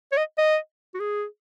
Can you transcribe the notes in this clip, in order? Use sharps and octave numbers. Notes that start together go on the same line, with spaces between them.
C#5
D#5
D#5
F#4
G#4